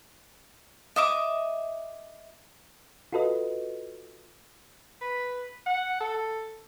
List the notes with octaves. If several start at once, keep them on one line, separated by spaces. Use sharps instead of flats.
D#5 E5 D6
F4 F#4 A4 B4 D#5
B4
F#5
A4